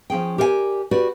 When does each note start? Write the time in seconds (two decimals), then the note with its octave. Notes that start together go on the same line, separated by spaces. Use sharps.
0.10 F3 C#4 G#4 G5
0.38 G4 A#4 D5 F5 G#5
0.91 F#4 G4 B4 D5